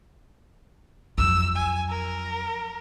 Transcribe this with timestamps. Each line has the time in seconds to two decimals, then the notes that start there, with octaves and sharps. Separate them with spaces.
1.18 F2 F#3 E6
1.56 G#5
1.90 A#4